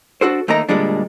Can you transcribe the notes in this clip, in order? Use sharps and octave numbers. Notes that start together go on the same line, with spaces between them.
D4 F#4 A4 C5
D#2 A3 A#3 D#4 A#5
D2 A#2 G3 G#3 D4